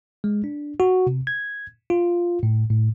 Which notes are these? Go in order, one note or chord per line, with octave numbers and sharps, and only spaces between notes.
G#3
D4
F#4
C3
G#6
F4
A2
A2